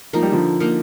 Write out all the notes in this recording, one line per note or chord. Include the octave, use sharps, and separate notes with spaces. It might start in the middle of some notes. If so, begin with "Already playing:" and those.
F3 A#3 D#4 A#4
G3
D3 F3
A#3 D#4 A#4